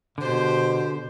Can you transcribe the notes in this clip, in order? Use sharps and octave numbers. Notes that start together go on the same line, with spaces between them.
B2 D3 G4 C5